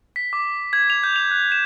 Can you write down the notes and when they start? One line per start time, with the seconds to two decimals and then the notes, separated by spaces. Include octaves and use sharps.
0.16 B6
0.33 D6
0.73 G#6
0.90 F7
1.04 G6
1.16 F7
1.31 F#6
1.52 E7